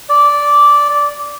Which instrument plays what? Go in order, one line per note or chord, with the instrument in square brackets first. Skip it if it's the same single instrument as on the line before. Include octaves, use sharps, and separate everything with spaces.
[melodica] D5